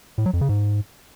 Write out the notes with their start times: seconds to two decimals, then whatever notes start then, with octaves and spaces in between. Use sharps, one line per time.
0.18 A2
0.26 F#3
0.33 F2
0.41 C#3
0.49 G#2